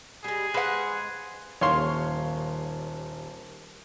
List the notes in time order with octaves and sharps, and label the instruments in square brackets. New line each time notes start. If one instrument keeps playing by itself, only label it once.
[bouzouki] G3 G#3 [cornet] G#4
[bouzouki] G#3 C5 F5 [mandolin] B4 F#5
[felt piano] D#1 D#2 [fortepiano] C#5 F5 C6